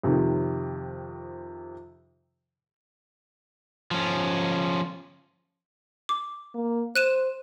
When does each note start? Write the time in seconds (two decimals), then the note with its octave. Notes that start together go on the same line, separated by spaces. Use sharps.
0.03 F2 C3 D#3
3.91 F3 C#4
6.09 D6
6.55 A#3
6.96 C5 F#6 D#7 E7